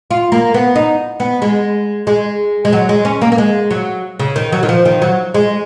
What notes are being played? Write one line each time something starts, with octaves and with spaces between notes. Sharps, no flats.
F4
A#3
B3
D#4
B3
G#3
G#3
G#3
F#3
G#3
C#4
A#3
A#3
G#3
F#3
C#3
D#3
F#3
D#3
F3
D#3
F#3
G#3